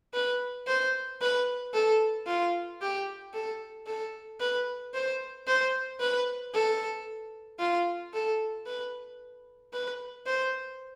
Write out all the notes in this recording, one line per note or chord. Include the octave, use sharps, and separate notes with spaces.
B4
C5
B4
A4
F4
G4
A4
A4
B4
C5
C5
B4
A4
F4
A4
B4
B4
C5